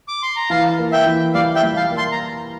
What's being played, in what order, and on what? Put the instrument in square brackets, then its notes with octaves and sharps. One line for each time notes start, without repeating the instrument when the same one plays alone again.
[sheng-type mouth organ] D6
C6
A#5
[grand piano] E3 [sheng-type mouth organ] F5 A5
[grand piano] A#3
[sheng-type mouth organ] E5 G5
[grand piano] E3
[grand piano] G3 [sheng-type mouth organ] D5 F5
[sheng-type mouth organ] E5 G5
[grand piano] G3
[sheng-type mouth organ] F5 A5
[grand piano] A#3
[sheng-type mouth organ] A5 C6
A#5